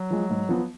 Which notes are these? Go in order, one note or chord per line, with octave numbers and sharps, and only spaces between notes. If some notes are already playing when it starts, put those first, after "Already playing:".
Already playing: F#3
F3 G#3
G#2
F3 B3